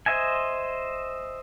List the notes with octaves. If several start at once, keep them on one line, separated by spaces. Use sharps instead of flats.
C5 D#5 E5 G#5